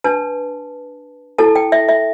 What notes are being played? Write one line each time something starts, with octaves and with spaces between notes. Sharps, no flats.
D4 B4 A5
E4 A4 A5
G5
E5
E5